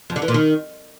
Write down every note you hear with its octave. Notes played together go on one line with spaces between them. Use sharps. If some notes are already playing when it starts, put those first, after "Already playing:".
F2
D3
E3
A#2
D#3